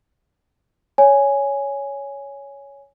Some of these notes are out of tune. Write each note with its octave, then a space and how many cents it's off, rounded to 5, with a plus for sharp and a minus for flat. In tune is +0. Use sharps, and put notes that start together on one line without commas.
C#5 +10 G#5 +0